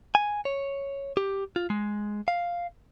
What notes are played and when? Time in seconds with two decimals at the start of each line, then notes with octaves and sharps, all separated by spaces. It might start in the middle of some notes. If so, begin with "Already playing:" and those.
0.15 G#5
0.45 C#5
1.17 G4
1.56 F4
1.70 G#3
2.28 F5